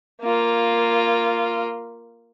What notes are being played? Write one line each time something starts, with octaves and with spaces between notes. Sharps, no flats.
A#3 F4